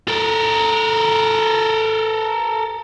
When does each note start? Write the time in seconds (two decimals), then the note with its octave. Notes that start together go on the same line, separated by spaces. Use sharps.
0.08 A4 A#4